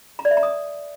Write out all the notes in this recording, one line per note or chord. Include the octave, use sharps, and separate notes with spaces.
A#5
D5
E5
A#5
D#6